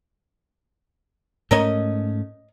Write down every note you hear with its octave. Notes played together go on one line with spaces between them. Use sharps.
G#2 A3 C#4 A#4 C#5 D#5